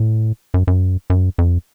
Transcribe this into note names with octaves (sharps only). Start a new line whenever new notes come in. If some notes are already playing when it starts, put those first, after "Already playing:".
Already playing: A2
F#2
F#2
F#2
F2